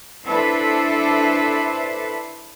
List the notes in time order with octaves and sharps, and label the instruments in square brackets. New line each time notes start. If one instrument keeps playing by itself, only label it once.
[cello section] D4 E4 A4 B4 C5 E5